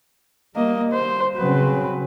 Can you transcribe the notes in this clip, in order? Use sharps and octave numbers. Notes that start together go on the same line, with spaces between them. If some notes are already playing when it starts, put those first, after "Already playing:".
G3 A#3 D#5
C5
C#3 F#3 C4 B4